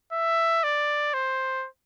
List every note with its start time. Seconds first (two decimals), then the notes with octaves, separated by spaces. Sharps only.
0.12 E5
0.64 D5
1.14 C5